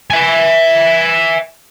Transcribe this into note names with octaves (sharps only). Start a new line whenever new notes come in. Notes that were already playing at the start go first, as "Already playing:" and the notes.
E5 G#5